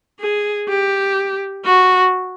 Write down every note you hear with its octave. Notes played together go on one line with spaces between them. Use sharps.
G#4
G4
F#4